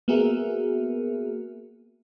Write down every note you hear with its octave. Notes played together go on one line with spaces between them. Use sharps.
A#3 B3 F#4 G#4 A#4 E5